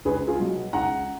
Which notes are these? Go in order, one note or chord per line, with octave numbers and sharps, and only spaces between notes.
C#2 G#4 B4
F4 G#4
B2 F#3
C#2 F#5 A#5